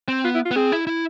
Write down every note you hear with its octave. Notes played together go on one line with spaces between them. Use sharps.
C4
B3 F4
E4
F4
B3
C4 G#4
E4
E4